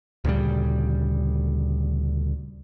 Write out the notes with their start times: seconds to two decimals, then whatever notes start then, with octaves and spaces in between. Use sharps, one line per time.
0.25 D2 A#2 C#3 G3